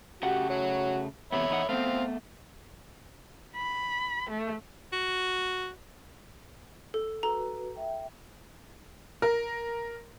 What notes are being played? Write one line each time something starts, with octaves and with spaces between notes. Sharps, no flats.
C#3 A3 F#4 G4 F#5
F#4 C#5
E2 C3 B3 C#5 E5 B5
E2 D#4 F#5
A3 B3 C4 F5
B5
A3
F#4
A4
F#4 A4 B4 A#5
E5 G5
A#4